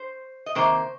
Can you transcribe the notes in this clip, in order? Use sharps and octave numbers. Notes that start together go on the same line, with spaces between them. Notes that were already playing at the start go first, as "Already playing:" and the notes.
Already playing: C5
D#5
C3 D#3 A#3 C5